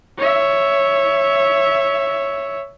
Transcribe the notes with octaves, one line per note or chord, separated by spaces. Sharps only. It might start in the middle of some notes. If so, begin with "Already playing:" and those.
C#5 E5